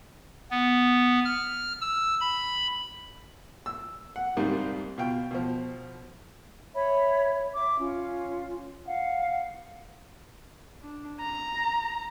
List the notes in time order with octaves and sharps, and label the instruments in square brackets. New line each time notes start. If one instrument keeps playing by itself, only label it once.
[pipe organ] B3
F6
E6
B5
[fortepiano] E6
F#5
C2 G#2 G3 A#3
B2 F4 G5
B2 F3
[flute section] C#5 E5 B5
E5 D6
C#4 F4
F5 F#5
[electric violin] D4
A#5